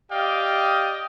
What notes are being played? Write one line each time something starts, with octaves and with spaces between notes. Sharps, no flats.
G4 D5 D#5 F5 G5